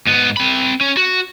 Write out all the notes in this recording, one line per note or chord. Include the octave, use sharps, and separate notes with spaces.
G#2 B3
C4 B5
C#4
F#4